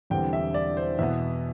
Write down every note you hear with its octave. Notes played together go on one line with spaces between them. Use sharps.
E1 E2 D3 G3 C4 G5
E5
D5
C5
E2 B2 B3 E5